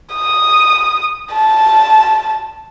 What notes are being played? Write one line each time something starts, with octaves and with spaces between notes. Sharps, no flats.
D#6
A5